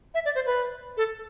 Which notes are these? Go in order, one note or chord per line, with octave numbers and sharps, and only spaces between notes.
E5
D5
C5
B4
A4